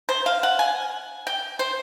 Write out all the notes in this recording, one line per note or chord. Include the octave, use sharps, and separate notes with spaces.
C5
F5
F#5
G#5
G5
C5